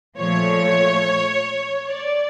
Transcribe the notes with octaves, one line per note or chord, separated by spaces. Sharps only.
A#2 F3 A3 C#5
D5